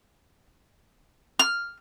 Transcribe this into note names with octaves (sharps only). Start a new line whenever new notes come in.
F6